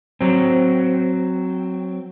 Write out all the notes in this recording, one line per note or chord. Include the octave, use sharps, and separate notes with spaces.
F#3 C4